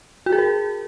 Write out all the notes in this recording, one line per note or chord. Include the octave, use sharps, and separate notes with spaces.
F#4
G#4
A#4